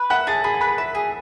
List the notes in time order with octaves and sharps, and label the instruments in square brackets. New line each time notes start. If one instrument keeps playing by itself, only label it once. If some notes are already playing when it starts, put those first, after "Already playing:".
Already playing: [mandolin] B4
[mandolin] E5 [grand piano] F#5 F#6
[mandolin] G#4 [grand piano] A5 A6
[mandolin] G#4 [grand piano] B5 B6
[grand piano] A6
[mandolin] B4 [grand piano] B5 B6
[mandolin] E5
G#4